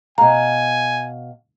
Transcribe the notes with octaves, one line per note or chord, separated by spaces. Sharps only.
B2 F5 G#5 A#5